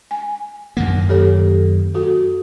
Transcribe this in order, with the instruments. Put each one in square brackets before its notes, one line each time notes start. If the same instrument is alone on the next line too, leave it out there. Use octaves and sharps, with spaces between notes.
[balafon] G#5
[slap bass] F#2 D#3 A#3 [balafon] F#5
[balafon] G4 A4 C#5
F#4 A4